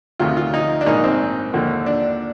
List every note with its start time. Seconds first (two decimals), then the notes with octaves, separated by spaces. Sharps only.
0.19 D2 C3 D#3 F4
0.37 F4
0.54 D#4
0.81 D4
0.86 A#1 G#2 D#3 D#4
1.04 C4
1.54 D#2 D3 F3
1.86 D4